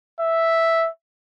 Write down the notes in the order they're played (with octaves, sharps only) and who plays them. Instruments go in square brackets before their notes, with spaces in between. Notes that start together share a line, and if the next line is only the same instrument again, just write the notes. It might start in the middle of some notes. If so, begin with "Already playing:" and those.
[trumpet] E5